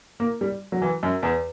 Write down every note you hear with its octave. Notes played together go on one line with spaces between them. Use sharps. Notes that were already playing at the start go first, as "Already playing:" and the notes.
A#3
G3
F#3
E3
F#2
E2